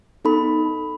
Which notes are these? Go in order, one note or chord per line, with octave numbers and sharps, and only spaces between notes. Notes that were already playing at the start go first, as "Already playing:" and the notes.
B3 D#4 A4 B5